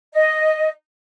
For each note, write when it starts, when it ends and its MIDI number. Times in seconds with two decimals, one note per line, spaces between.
0.14 0.68 75